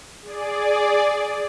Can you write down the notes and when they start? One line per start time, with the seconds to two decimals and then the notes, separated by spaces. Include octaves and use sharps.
0.22 G#4 D5